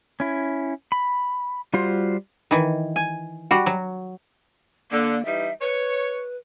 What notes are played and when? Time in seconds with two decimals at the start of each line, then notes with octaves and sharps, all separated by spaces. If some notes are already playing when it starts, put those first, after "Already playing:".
0.20 C#4 E4
0.92 B5
1.74 G3 F4 F#4 C5
2.51 D#3 E3
2.96 G#5
3.51 G3 F#4
3.66 F#3
4.91 D3 A#3
5.25 E3 G3 D#4 E5
5.60 B4 C#5